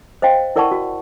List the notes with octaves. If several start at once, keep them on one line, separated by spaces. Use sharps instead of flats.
C5 D#5 F5 G5
E4 A#4 D5 F#5 A5 C#6
F#4